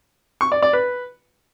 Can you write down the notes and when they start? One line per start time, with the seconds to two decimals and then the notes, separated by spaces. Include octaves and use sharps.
0.41 C#6
0.52 D5
0.62 D5
0.73 B4